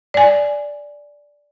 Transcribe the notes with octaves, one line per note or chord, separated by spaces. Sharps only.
D5 G#5